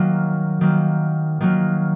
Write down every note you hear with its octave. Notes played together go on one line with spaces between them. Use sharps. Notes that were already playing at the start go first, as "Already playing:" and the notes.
Already playing: D#3 F#3 A#3
D#3 F#3 A#3
D#3 F#3 A#3